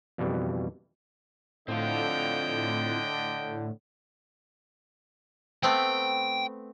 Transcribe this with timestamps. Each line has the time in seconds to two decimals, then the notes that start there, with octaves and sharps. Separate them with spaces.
0.18 F2 B2 E3 G3
1.68 A2 D3 C4 F4 D#5 G5
5.63 A3 B3 C4 G5